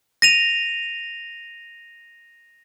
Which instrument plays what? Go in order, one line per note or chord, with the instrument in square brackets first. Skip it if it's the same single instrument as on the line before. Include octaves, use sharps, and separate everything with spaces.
[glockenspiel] A#6 D#7 F7